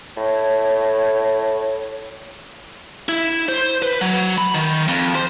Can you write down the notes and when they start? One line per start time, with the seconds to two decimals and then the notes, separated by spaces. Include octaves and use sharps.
0.17 A2 C#5
3.09 E4
3.48 C5
3.82 B4
4.01 F#3
4.38 B5
4.54 D#3
4.88 F2
5.15 C5